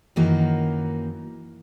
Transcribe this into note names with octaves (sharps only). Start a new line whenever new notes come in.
F#2 D#3 E3 A#3 D#4 F#4